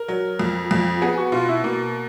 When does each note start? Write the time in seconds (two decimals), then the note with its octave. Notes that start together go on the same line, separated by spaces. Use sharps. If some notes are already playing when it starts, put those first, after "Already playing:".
Already playing: A#4
0.08 F#3
0.39 F2
0.71 F2
1.02 B3 G#4
1.18 F#4
1.32 B2 F4
1.49 E4
1.63 B2 A#3